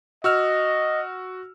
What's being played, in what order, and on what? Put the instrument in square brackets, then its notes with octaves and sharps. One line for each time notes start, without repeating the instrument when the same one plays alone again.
[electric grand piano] F#4 E6 F6 [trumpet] D#5